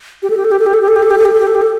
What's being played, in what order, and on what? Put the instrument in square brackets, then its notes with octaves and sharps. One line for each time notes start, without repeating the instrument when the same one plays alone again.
[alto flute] G4
A4
G4
A4
G4
A4
G4
A4
G4
A4
G4
A4
G4
A4
G4
A4
G4
A4
G4
A4